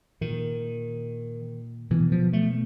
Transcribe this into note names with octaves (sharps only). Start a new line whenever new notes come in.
A#2 D#3
B2 E3
F3
A3